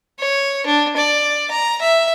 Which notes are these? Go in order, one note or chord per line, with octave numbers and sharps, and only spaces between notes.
C#5
D4
D5
A#5
E5